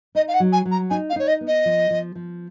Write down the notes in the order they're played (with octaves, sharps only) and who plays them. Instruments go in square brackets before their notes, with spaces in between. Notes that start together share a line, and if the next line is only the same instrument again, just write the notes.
[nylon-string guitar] D#4 [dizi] D#5
[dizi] F5
F#5
[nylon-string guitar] F#3
[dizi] G#5
[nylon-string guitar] F#3
[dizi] A#5
[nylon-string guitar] D#4 [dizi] G#5
[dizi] F5
[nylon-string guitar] D#4 [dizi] C#5
[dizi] D#5
[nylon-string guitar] B3
[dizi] D#5
[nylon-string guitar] F3
F3
F3